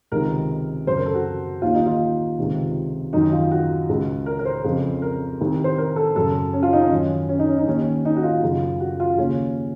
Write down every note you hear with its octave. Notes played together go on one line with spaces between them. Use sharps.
C#2 C3 D#3 A#4
F#2 C#3 C5
A#4
A4
F#4
D#2 D#3 F4
D#4
F4
C#2 C3 D#3
F#2 D#3 D#4
F4
F#4
C#2 C#3
A#4
A#4
C5
F2 C#3
A#4
C2 C3 D#3
C5
A#4
A4
F#2 C#3 A4
C#4
F4
D#4
C#4
F#2 D#3
C#4
D#4
C#4
D#4
D#2 D#3 C#4
D#4
F#4
F4
F#2 C#3
F#4
F4
D#2 C#3 C#4